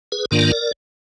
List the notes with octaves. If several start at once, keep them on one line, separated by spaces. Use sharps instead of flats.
G#4 B4
G#2 D#3 A#3 D4 F4 A#4 D5